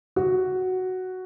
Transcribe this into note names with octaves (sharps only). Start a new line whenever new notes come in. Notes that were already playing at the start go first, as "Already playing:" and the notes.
F#4